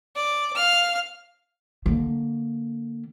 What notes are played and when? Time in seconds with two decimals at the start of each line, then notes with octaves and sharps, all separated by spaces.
0.16 D5
0.56 F5 F6
1.86 D3 A#3